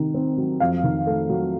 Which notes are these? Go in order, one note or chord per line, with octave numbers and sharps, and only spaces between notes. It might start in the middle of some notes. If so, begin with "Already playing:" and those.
Already playing: C3 D#3
C4
F#3
F2 F5
D#3
A3
F#3